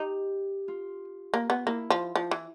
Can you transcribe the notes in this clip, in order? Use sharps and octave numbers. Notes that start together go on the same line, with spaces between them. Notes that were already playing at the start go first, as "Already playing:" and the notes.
Already playing: D#4 G4
F4
A#3
B3
A#3 E4
F3
F3
E3